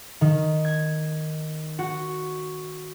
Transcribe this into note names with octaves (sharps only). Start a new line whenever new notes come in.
D#3
G#6
F#4